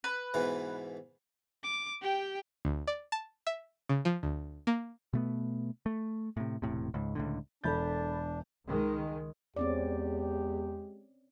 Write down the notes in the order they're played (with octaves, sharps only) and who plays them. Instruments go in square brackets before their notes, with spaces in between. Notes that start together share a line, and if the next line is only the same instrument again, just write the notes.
[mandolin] B4
[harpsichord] G#2 B2 E3
[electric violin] D6
G4 G5
[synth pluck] D2
D5
A5
E5
C#3
F3
D2
A#3
[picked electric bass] B2 A3 B3
A3
A2 C3
E1 A2 C3
C#2 G#2
C#2 A2 D3
[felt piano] E1 G6 [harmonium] D4 [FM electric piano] A4 B5 A6
[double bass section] C#2 D#3 G#3
[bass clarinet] E2 [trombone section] G#3 G4 [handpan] C4 C#4 D5